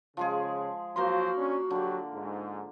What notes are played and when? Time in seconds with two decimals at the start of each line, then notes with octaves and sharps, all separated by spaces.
0.17 C#3 F3 G#3 G#4
0.96 F3 F#3 A#3 F#4 A#4 C5 C6
1.37 C#4 D4
1.70 D3 F#3 G4
2.14 G#2